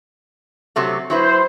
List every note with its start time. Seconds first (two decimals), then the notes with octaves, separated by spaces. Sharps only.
0.76 C3 F#3 A3
1.10 F#3 E4 B4 C5